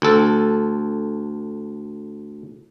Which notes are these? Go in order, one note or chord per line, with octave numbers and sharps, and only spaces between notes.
D2 A4